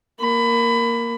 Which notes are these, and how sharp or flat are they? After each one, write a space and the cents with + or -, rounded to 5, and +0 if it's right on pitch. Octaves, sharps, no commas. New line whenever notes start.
A#3 +0 B5 +20